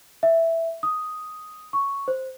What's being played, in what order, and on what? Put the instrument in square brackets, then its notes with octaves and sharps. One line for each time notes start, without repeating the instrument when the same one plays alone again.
[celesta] E5
D#6
C#6
C5